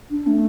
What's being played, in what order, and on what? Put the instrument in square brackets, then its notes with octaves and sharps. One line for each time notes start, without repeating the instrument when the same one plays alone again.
[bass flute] D4
A3